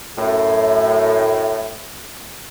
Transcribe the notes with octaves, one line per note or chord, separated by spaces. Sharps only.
F#2 A2